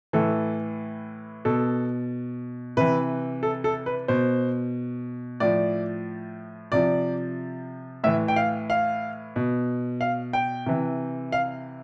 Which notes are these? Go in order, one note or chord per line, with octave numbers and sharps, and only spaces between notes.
A2 E3 A4
B2 A4
C3 E3 B4
A4
A4
B4
B2 C5
A2 F3 D5
C3 F3 D5
A2 E3 E5
G5
F5
F5
B2
F5
G5
C3 E3
F5